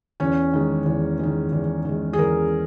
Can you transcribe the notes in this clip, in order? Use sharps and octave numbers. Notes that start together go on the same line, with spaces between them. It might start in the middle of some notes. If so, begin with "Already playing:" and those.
E2 C#4
D#3 G#3
E2
D#3 G#3
E2
D#3 G#3
G#4
E2 A#4